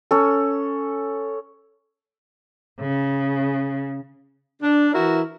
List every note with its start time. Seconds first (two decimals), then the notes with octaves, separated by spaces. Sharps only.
0.11 C#4 A4
2.81 C#3
4.62 D4
4.94 E3 E4 F#4 A#4